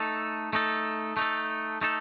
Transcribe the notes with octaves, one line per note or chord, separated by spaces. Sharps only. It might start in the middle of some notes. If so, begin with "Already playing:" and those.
Already playing: A3 D#4 A4
A3 D#4 A4
A3 D#4 A4
A3 D#4 A4